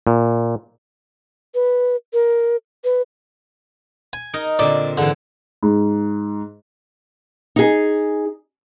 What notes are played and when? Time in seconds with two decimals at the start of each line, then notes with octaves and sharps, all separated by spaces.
0.07 A#2
1.55 B4
2.13 A#4
2.84 B4
4.13 G#5
4.33 D#4 A#4
4.59 A#2 D3 C4 D5
4.97 G#2 D3 E3
5.63 G#2
7.56 D#4 G#4